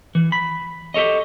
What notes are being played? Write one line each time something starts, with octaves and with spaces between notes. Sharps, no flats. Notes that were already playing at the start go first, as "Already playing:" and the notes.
E3
B5
G4 A4 C#5 D#5